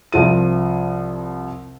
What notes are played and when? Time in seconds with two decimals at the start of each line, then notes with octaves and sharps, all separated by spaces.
0.12 C2 F3 D#7